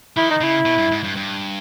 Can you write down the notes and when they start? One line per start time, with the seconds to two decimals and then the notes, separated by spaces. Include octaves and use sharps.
0.17 D#3 E4
0.30 D#4
0.41 C#3 E4
0.66 B2
0.78 G2
0.92 G#2
1.04 G2
1.16 G2